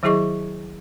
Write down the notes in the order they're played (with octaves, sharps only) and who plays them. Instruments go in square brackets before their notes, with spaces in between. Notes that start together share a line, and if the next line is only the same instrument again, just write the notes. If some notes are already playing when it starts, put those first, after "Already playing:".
[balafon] D#3 F#3 E4 G#4 D#5 C#6